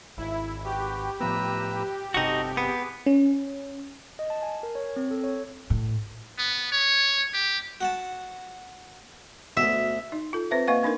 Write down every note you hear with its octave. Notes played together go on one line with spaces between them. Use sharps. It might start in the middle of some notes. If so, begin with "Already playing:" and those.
G#1 E4
F#4 G4 B4
A2 F3 B3 B4 A#5 E6
G1 C3 D#4 F#4 A4 D#5
B3 G#4 B4 D6
C#4
D#5
A5
G#5
A#4
C#5
C4
A4
C#5
A2
B3
C#5
G4
F#4 F#5 A5
D2 B2 E5
D#4
F4 A4
C4 B4 C5 E5
A#3 B4 D#5 F5 F#5 C#6
A#3 D4 D#4 A#4